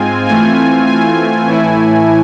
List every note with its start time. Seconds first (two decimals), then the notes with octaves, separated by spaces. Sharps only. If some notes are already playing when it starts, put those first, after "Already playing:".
Already playing: G#2 G#3 C4 F4 G#5
0.26 E3 A3 C4 F4 G#5
0.56 G#5
0.87 G#5
1.47 A2 E3 A3 E4